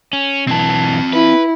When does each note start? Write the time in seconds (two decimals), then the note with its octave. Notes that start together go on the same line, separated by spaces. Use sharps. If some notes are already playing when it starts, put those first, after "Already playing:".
0.13 C#4
0.47 B1 E3 C4 A5
1.13 E4 B4